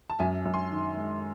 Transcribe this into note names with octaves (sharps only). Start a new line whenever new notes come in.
A5
F#2 E5 G#5
F#2
G#5 C6
D#3
G#3